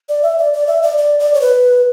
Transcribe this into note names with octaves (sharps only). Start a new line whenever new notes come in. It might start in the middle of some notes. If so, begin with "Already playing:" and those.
D5
E5
D5
D5
E5
D5
D5
D5
C#5
B4